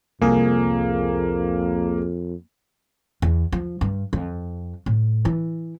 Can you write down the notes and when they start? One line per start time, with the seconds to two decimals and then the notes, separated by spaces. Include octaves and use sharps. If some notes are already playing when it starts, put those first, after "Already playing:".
0.21 C2 F2 A#3 G#4
3.22 E2
3.52 F3
3.81 G2
4.13 F2
4.86 A2
5.25 E3